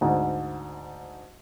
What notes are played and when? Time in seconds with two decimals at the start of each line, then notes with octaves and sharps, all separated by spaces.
0.01 D2 G#2